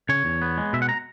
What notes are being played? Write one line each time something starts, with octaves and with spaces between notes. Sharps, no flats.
C#3 C#5
E2
B3
G#3
B2 E5
F#5
A#5